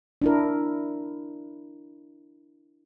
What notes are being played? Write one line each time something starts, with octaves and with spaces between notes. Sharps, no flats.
D4 E4 A#4